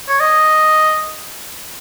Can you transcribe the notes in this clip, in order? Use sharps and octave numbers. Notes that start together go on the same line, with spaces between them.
C#5
D#5